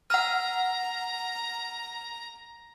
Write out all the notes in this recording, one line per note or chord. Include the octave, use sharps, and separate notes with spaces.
F#5 A#5 F6